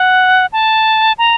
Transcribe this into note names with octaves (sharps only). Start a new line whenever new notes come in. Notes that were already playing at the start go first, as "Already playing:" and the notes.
Already playing: F#5
A5
A#5